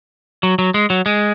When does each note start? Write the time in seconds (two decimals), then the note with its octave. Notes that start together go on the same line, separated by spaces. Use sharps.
0.43 F#3
0.59 F#3
0.74 G#3
0.90 F#3
1.06 G#3